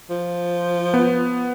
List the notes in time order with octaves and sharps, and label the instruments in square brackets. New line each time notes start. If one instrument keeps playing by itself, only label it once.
[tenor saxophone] F3
[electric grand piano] B3